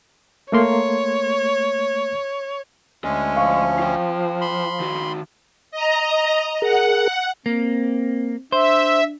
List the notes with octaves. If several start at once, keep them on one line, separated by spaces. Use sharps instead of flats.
A3 A#3 C#5 C6
D2 G#3 C#4 D#5
F3 F5 C#6
F4 G5
B5 C6
D#3 F#4
D#5 A#5
G#4 A#4 F#5
A#3 C4
D4 C5 E5